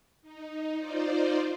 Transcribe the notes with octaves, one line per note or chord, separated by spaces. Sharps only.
D#4
D#4 F4 C5 D5